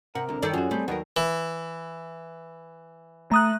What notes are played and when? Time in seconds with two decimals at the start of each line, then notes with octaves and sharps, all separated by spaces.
0.15 C3 A#4 F#5
0.29 C2 D3
0.42 G2 D#3 A4 D5
0.54 F#2 F4 F#4 G#4
0.71 G3 A3 C4
0.88 D#2 F#3 B3 A#4
1.17 E3
3.31 A3 A#5 D#6 F#6